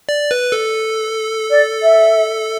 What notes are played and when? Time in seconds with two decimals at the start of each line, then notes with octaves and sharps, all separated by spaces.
0.09 D5
0.31 B4
0.52 A4
1.50 D5
1.83 E5